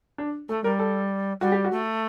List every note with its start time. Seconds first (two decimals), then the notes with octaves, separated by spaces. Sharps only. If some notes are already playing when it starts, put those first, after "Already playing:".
0.18 D4
0.49 A3 A4
0.64 G3 A#4
0.79 A4
1.41 G3 F#4
1.52 G4
1.65 F#4
1.71 A3